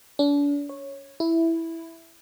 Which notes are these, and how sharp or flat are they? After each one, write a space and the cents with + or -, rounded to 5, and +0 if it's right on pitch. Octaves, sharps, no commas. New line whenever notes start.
D4 -40
C#5 -10
E4 +0